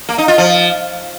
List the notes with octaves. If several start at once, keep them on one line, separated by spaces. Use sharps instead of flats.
A#3
D#4
F4
F3